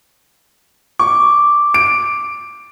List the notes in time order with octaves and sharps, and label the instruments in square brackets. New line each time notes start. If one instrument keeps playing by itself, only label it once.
[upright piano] C#6 [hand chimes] D6
[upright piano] D7